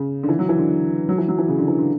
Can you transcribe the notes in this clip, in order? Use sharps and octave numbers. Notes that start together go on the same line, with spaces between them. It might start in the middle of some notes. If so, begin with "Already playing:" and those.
Already playing: C#3
D3
E3
F#3
E3
D3
F#3
E3
F#3
E3
C#3
D3
E3
D3